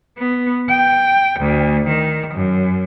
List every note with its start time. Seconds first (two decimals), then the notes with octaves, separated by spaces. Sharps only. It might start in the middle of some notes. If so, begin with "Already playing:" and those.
0.18 B3
0.70 G5
1.39 D2
1.87 D#3
2.34 F#2